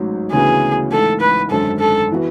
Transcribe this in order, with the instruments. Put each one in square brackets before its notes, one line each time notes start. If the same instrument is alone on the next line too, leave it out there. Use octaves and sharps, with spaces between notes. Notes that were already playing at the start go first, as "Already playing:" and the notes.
Already playing: [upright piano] A1 G#2 F#3
[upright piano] D2 C#3 E3 B3 F#4 [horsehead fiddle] G#4
[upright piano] A1 G#2 E3 [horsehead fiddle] A4
[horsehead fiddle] B4
[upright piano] G#1 F#2 D3 [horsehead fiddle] A4
[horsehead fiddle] A4
[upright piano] E3 B3 F#4